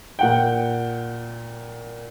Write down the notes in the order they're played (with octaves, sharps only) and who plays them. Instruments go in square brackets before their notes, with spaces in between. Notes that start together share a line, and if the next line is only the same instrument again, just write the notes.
[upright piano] A#2 F#5 G5